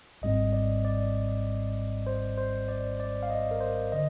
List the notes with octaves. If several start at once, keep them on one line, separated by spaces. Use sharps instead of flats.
G#1 G#2 G3 C4 D#5
D5
D5
C5
C5
D5
D5
F5
D#5
A#4
C5
D3 D#5